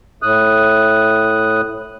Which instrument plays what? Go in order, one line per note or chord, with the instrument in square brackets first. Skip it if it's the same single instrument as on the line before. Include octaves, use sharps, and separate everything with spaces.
[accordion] A2 D#6 F#6